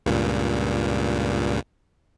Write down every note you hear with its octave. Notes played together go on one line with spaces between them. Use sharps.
C#2 G2 A#2